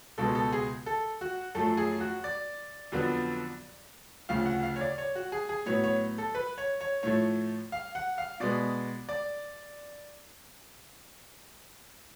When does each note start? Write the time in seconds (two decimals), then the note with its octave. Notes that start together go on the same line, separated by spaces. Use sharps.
0.18 C#2 B2 G#3 B3 A4
0.35 A4
0.52 G#4
0.86 A4
1.21 F#4
1.55 F#2 F3 A3 A4
1.77 G#4
2.00 F#4
2.24 D5
2.92 F2 D3 F#3 B3
4.29 D2 C#3 F3 F5
4.46 F#5
4.63 F5
4.76 C#5
4.81 D5
4.98 C#5
5.15 F#4
5.32 G#4
5.49 G#4
5.66 A2 F#3 B3 C#5
5.84 C#5
6.18 A4
6.35 B4
6.58 C#5
6.81 C#5
7.03 A2 F3 A3 C#5
7.72 F5
7.95 F#5
8.18 F5
8.40 B2 G#3 B3 D5
9.09 D5